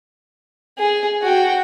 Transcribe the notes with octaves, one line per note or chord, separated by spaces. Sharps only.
G#4
F#4 G5